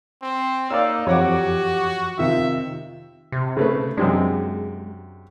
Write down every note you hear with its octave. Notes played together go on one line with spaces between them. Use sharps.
C4
A#3 D#4 C#5 D5 F5 E6
F2 F3 F#4 G4 C#5 F#5 D6
C3 D#3 F4 E5
C3
C#3 A3 B4
F#2 C3 G#3 D4